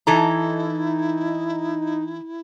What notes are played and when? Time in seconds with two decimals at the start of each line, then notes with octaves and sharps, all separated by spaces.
0.07 E3 D#4 E4 A4 A#5